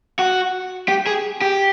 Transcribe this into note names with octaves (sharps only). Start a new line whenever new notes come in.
F#4
G4
G#4
G4